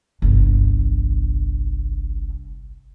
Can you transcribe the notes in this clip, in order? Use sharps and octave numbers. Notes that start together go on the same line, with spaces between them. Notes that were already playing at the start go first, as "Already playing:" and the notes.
G1 C2